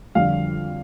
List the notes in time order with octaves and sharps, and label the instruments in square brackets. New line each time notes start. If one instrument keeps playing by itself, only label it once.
[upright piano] F2 D3 G3 F5